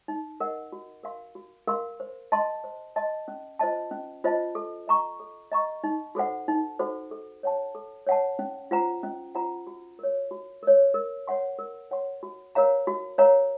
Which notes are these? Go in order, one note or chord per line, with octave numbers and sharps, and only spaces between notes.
D#4
A#4 D#5 F#5
F#4
A#4 F5 C6
F#4
A#4 F5 C6
C5
D#5 A5 C6
C5
D#5 A5 C6
C#4
F4 C5 D#5 A5
C#4
F4 C5 D#5 A5
A4
D#5 A#5 C#6
A4
D#5 A#5 C#6
D#4
F#4 A4 C5 F#5
D#4
F#4 A4 C5 F#5
A4
C#5 F#5 A5
A4
C#5 F#5 A5
C#4
F4 C5 F#5 A#5
C#4
F4 C5 F#5 A#5
F#4
A#4 C#5
F#4
A#4 C#5
A#4
C#5 F#5 C6
A#4
C#5 F#5 C6
F#4
A#4 C#5 F5 A#5
F#4
A#4 C#5 F5 A#5